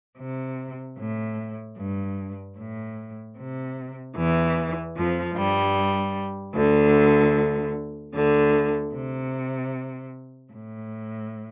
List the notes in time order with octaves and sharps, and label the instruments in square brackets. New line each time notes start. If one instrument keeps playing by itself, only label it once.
[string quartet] C3
A2
G2
A2
C3
E2 E3
F2 F3
G2 G3
D2 D3
D2 D3
C3
A2